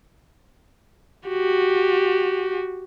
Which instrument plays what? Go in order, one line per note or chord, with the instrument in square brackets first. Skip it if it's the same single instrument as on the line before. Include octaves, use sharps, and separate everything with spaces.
[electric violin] F#4 G4